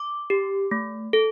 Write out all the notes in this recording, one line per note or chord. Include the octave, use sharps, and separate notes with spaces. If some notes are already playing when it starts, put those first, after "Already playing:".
Already playing: D6
G4
A3
A4